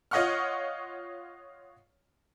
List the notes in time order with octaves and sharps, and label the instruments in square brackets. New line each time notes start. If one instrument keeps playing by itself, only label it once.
[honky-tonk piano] F4 C#5 D#5 F#5 C#6 F6